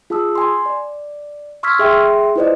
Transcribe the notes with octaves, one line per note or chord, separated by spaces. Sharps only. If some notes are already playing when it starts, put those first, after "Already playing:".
F4 G#4 A5 D#6 E6
G#5 C6
D5
C6 C#6 E6 F6 G#6 B6
G#4 E5 G5 C6
E4 F4 B4 C5 D5 D#5